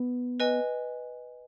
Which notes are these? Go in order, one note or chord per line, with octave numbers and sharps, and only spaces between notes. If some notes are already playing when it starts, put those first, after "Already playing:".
Already playing: B3
B4 D#5 G#5